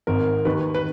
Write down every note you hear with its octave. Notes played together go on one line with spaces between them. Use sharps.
G#1 G#2 D#3 A#4
D#2 D#3 B4
B4